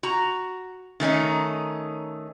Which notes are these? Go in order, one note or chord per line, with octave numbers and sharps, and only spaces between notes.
F#4 A#5
D#3 A3 C#4 D#4